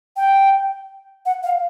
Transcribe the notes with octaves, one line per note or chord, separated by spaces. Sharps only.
G5
F#5
F5